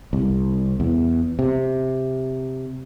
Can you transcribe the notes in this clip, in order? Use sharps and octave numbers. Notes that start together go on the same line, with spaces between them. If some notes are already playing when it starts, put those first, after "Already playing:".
C2
E2
C3